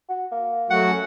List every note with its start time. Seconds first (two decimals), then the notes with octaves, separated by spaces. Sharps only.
0.09 F#4
0.32 A#3
0.70 F#3 A3 F#4 F#5
0.87 C#4